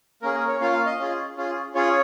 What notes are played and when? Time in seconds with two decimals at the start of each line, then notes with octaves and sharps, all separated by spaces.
0.22 A#3 C#4 G#4 A#4
0.35 A#4
0.48 C#5
0.60 A#3 C#4 F4 F5
0.73 F5
0.86 D#5
0.99 C#4 F4 G#4
1.37 C#4 F4 G#4
1.75 C#4 F4 G#4 C#5